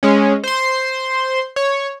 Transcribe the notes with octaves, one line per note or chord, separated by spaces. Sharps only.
G#3 C#4
C5 C6
C#5